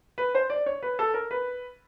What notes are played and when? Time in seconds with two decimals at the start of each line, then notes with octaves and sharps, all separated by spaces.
0.18 B4
0.35 C5
0.50 D5
0.66 C#5
0.82 B4
0.99 A4
1.14 A#4
1.31 B4